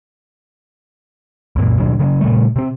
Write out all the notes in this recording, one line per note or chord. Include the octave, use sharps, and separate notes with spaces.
C2 F#2 A#2
D#2 B2 F#3 D4
C#3 F#3 B3 C#4
A#2 C#3 G3 A3
C3 C4